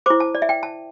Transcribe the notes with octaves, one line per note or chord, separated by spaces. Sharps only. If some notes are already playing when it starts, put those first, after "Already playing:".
E4 C5 D6
A5
D5
E5
G5
A5